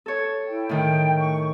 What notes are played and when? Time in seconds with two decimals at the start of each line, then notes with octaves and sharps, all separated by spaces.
0.06 A4 C#5
0.48 E4 G5
0.69 A2 D#3 G5
1.17 C#6